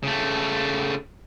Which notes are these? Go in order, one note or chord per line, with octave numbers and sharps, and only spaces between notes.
C#3 A3